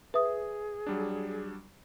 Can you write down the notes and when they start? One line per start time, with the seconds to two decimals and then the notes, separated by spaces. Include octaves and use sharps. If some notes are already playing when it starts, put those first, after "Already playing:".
0.14 G#4 B4 E5 D#6
0.87 F#3 G3 D4